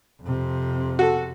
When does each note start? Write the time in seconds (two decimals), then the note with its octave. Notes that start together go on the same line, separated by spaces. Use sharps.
0.22 F2 C3
0.99 F#4 A4